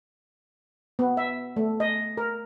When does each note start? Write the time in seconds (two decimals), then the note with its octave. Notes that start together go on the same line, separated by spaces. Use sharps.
0.99 B3
1.17 E5
1.57 A3
1.80 D#5
2.17 A#4